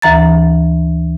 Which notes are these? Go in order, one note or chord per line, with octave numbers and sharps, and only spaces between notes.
D2 E3 A#5 A6